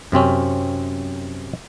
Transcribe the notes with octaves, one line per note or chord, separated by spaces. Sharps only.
F#2 C3 C4 C#4